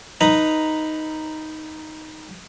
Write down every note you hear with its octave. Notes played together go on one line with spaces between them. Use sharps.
D#4 B4 A#5